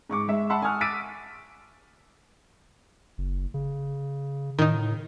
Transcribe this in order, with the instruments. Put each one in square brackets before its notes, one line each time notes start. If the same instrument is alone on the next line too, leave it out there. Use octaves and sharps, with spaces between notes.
[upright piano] G#2 C#6 D6
G#3 E5
E5 F#5 A5 B5 C6 E6
G#5 A5 C#6 D#6 F6 F#6
D6 E6 A6 B6 D7 D#7
[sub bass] F#1
C#3
[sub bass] A2 [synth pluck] D#3 D#4